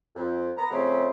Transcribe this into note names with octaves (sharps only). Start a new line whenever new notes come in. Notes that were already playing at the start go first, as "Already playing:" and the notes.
F2
B3 A#5
F2 C#3 A3 C4